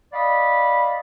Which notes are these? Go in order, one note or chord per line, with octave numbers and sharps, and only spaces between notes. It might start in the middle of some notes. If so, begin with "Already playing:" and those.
D5 D#5 F5 B5